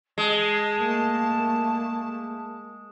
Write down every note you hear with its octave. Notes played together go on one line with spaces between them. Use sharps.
G#3 A5
A3 A#3